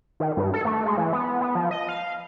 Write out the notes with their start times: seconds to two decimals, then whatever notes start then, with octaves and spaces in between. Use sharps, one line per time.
0.20 D#3
0.37 G2
0.54 A4
0.65 A3
0.86 G#3
0.98 E3
1.13 B3
1.41 B3
1.55 F3
1.71 D#5
1.89 F5